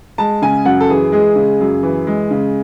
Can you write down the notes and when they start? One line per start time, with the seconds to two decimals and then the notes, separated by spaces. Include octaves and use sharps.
0.18 G#3 A5
0.42 C#3 G#5
0.65 F#2 F#5
0.81 A4
0.89 E3 G#4
1.12 G#3 G#4
1.36 C#3
1.60 F#2
1.83 E3
2.07 G#3
2.31 C#3